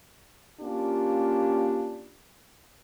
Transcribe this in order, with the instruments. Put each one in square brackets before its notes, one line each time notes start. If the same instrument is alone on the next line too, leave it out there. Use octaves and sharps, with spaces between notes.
[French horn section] A#3 C#4 D4 F4 G4